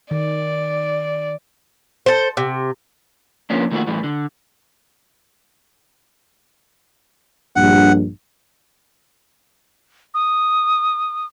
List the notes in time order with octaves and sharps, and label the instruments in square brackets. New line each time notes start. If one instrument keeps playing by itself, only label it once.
[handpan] D#3 [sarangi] D5
[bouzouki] A4 C5
C3
[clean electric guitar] F3 A#3 B3 C#4 D4
D#3 A3 A#3 D4 F4 F#4
A2 E3 G3
D3
[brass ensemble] A#1 G2 [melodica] F#5
[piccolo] D#6